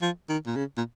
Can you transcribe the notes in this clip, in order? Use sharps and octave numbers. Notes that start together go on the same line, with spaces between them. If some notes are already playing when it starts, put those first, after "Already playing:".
F3
D#3
A#2
C#3
A#2